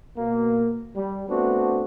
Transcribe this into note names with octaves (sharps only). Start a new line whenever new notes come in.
B2 A#3
G3
A3 B3 C4 D4 F#4